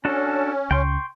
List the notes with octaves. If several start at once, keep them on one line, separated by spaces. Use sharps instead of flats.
C#4 D4 F#4 A4
C#2 G5 C6 C#6